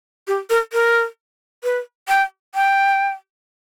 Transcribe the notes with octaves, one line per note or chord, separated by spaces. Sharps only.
G4
A#4
A#4
B4
G5
G5